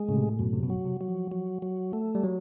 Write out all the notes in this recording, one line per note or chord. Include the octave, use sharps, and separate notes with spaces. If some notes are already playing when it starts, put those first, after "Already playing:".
Already playing: G#3
A2 C#3
C3
F#2 B2
C3
B2
F#3
C3
F#3
F3
F#3
F#3
A3
G3
F#3